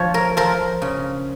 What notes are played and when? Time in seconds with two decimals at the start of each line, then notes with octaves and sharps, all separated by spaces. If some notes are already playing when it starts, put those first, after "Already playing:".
Already playing: F3 C#5
0.14 A#4
0.37 F3 A#4
0.82 C#3